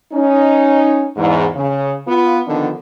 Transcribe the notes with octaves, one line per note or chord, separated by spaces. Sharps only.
C#4 D#4
E2 G#2
C#3
B3 F4
D3 D#3 F3 B3 D4 D#4